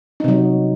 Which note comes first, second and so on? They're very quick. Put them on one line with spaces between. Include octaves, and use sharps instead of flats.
D#4 C3 F#3